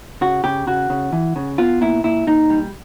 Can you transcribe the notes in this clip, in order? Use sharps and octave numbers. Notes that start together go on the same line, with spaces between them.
C#3 F#4
C#3 G4
C#3 F#4
C#3
E3
C#3
B3 F4
A#2 E4
A#2 E4
A#2 D#4
G3